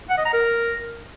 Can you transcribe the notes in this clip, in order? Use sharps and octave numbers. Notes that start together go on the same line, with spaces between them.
F#5
D#5
A#5
A#4